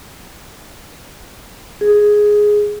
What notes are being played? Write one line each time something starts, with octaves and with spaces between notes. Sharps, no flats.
G#4